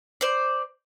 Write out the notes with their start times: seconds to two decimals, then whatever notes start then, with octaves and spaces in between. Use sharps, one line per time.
0.21 C5 D5